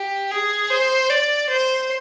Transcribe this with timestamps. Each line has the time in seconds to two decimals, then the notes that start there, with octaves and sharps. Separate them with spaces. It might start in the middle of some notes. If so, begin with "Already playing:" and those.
Already playing: G4
0.31 G#4
0.70 C5
1.10 D5
1.49 C5